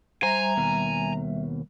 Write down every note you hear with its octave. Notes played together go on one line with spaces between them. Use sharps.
G3 C5 E5 G#5 A#5
D#2 B2